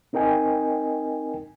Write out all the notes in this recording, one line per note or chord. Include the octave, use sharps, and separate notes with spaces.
C4 D#4 A#4 D#5 G5 G#5